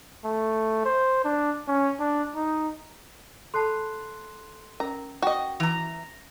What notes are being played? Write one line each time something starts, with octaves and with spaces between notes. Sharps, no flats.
A3
C5
D4
C#4
D4
D#4
A4 A5 B5 C6 F#6 C7
C#4 A#4 A#5
F#4 D#5 G5
E3 A#5 A#6 F7